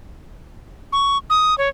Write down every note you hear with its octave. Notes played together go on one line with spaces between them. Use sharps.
C#6
D#6
C#5